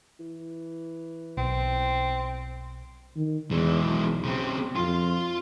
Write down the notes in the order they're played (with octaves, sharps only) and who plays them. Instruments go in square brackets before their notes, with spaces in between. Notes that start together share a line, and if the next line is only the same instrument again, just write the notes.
[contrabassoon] E3
[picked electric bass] B1 [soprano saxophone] C4
[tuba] D#3
[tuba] E2 [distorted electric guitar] E3 G#3
[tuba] B1
[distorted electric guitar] C#3 C4
[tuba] F2 [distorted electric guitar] F4 F5